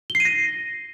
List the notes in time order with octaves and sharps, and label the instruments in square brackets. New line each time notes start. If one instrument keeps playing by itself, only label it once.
[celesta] G7
C7
D#7
A#6